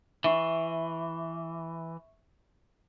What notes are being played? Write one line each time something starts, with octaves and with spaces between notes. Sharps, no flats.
E3 E5 C#6 C7